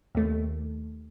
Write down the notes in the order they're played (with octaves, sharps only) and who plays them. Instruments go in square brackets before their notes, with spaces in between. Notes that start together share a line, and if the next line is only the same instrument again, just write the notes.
[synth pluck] D#2 A3